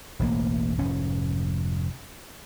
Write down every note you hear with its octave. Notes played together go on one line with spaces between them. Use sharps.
E1 A1 A#3
F1 G#2 C#4